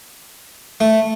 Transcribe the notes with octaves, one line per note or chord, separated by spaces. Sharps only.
A3